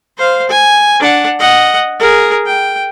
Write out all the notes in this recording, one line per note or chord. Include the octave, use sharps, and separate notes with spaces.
C5 F5
G#5
D4 F#5
D#5 F#5
G#4 A#4
G5